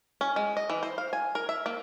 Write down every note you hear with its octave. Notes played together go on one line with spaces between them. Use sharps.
C#4
G#3
D#5
E3
C5
F5
G#5
A#4
E5
A#3